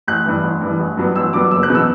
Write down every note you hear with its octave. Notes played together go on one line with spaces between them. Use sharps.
A1 F#6
G2 E3
A1
G2 E3
A1
G2 F#3 B3
A1 E6
G2 F#3 B3 D6
F#1 E6
F#6
E2 B2 F#3 B3
E6